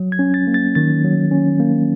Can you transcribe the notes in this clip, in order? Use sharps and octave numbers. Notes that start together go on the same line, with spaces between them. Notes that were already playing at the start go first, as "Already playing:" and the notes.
Already playing: F#3
G#6
C#4
A6
A#3
A6
D#3 A6
F#3
C#4
A#3